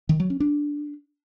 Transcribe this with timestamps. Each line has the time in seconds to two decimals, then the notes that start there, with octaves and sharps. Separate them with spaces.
0.09 D#3
0.20 F#3
0.30 C#4
0.40 D4